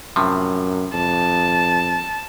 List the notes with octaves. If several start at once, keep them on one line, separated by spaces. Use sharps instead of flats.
F#2 A2 C3 F3
F2 A5